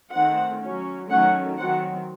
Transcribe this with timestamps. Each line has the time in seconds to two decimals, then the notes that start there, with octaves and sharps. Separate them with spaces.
0.13 D#3 A3 C4 F#5
0.61 F#3 C#4
1.09 D#3 F#3 A3 C#4 F#5
1.57 D#3 F#3 C4 F#5